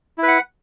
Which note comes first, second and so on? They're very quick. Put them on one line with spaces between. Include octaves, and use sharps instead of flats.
E4 B4 F#5